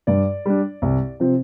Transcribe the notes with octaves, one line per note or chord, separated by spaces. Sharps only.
G2 D5
G3 D4
C2
C3 F3 C4